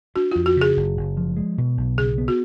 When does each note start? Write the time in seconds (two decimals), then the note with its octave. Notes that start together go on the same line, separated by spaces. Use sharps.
0.16 D4 F#4
0.31 F2 F4
0.46 F#4
0.57 C#3 G#4
0.77 F#1
0.97 F#1
1.17 F3
1.37 G#3
1.58 B2
1.78 B1
1.98 C#3 G#4
2.18 B3
2.28 F#4